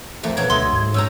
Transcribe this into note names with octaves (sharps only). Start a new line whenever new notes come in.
F2 A3 A#3
B2 F#3 G#6
D2 A3 A4 D#5 C6
G#2
C#4 G5 A#5 E6